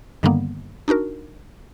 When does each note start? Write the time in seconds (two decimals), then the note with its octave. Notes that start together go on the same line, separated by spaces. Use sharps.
0.23 G2 D3 D#3 G3 A#3 B3
0.88 D4 D#4 F#4 A#4